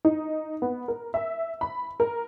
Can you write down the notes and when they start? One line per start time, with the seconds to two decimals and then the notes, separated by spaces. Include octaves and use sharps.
0.05 D#4
0.62 B3
0.88 A#4
1.14 E5
1.61 B5
2.00 A#4